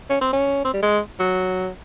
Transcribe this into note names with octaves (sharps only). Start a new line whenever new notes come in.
C#4
C4
C#4
C4
G3
G#3
F#3